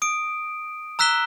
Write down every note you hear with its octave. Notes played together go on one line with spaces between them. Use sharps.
D#6 D7
A#5 E6 F#6 B6 E7 G7